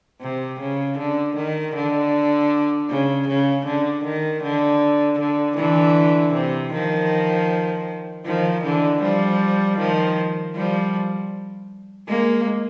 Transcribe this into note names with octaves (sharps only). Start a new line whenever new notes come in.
C3
C#3
D3
D#3
D3
C#3
C#3
D3
D#3
D3
D3
D3 E3
C3
D#3 F3
D#3 F3
D3 E3
F3 G3
D#3 F3
F3 G3
G#3 A#3